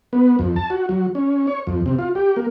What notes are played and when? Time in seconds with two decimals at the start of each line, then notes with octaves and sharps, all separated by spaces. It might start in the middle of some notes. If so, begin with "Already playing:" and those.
0.13 B3
0.39 F2
0.56 A5
0.70 F#4
0.89 F#3
1.15 C#4
1.47 C#5
1.67 F2
1.86 C3
1.99 F4
2.15 G4
2.36 A#3